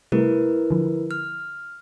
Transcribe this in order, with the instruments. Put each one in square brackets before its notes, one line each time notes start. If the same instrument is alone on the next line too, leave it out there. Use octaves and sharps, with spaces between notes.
[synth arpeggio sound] C3 G3 A3 [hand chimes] E4 A#4 B4
[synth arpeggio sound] D3 F3
[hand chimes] F6